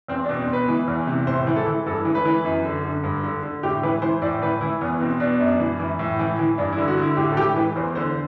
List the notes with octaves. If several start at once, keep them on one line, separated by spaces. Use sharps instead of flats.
E2 C4
D4
B2
C4
B2 B4
E3
E2
C3
A2 C5
E3
A4
E3
G2 A4
E3
B4
E3
F#2
D3
D3
G2
D3
D3
A2 G4
E3 B4
E3 C5
A2 D5
E3 B4
E3 E4
E2 B3
B2 C4
B2 D4
F#2
E3
E3
A2
E3
E3
G2 D4
E4
D3
F#4
D3
E4
A2 G4
A4
E3 G4
E3 B4
E2 C5
D3 C5